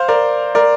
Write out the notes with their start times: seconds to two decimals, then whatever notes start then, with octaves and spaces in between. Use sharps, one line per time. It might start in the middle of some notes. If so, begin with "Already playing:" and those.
Already playing: C5 F5
0.08 A#4 D5
0.55 A#4 D5